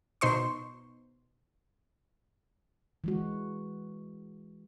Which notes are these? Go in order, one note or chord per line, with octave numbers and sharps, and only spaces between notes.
B2 D#4 C5 C6 C#6
E3 G#3 F#4